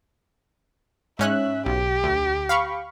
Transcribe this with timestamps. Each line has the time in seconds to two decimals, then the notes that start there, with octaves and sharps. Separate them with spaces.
1.19 G#2 C#4 E5 F#6
1.66 B1 G4
2.03 D2
2.49 F5 B5 C#6